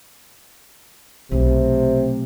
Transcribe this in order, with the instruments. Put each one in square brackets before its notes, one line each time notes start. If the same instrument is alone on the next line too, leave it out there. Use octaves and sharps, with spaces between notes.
[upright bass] B1 A3 [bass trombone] C3